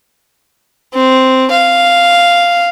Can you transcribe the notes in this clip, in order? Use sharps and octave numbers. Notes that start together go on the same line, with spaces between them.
C4
F5